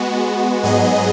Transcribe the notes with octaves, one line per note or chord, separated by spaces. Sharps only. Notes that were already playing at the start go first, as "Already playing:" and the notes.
Already playing: G#3 B3 F#4
G#2 F#3 B3 G#4 D#5